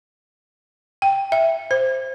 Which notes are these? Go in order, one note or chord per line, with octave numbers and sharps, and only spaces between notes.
G5
E5
C5